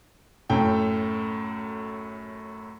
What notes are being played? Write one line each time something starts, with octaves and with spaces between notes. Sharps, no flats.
F#2 A2 A3 G5